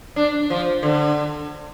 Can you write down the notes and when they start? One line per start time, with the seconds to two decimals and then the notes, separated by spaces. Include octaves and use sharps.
0.16 D4
0.50 F3
0.83 D3